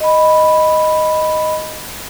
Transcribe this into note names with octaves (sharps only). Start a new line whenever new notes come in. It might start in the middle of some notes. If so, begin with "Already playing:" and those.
D#5 B5